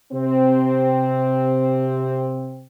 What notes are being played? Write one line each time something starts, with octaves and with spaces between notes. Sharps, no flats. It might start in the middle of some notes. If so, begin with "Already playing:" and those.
C3 C4